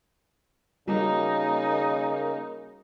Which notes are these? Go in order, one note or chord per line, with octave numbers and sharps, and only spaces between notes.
C#3 G3 A#3 D#4 F#4